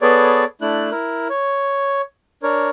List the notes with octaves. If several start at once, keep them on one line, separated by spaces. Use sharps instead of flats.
B3 G#4 A4 B4 C#5 D5
A3 D4 E4 F#6
E4 A#4
C#5
D4 A#4 C#5